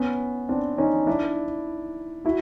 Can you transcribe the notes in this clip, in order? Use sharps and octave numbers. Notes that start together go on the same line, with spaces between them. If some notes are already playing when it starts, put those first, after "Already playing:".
Already playing: B3 C#4
C4 D4
C#4 D#4
D4 E4
E4 F#4